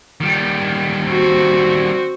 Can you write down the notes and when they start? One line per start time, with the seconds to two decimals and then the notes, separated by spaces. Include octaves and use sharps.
0.21 D#3 G3
1.08 C4 F#4